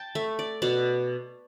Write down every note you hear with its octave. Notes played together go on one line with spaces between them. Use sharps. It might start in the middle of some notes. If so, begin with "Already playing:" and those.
Already playing: G5 A5
A3 E5
D5
B2 D5